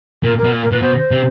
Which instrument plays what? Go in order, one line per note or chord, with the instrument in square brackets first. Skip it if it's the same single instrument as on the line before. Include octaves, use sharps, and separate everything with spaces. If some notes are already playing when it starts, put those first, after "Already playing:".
[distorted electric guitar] A#2 [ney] A#4
[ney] A#4
[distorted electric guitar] B2
A#2
[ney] A#4
[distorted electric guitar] A#2 [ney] B4
[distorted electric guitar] B2 [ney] C5
[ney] C5
[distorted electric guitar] C3